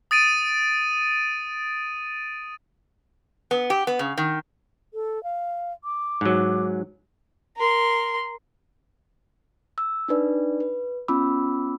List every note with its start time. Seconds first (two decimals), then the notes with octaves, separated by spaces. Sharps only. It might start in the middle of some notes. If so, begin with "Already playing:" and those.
0.11 D#6 A6 D7 D#7
3.51 B3
3.70 G4
3.87 B3
3.99 C#3
4.18 D#3
4.94 A4
5.24 F5
5.84 D6
6.21 G#2 F#3
7.56 A#4 C6
9.78 E6
10.08 D4 D#4 B4 D5
10.60 B4
11.08 B3 C#4 F4 B5 D6 E6